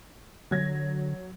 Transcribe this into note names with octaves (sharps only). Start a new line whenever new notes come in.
D3 F#3 G#6 A#6